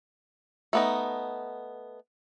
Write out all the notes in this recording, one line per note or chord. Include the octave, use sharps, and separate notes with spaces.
A3 B3 D#4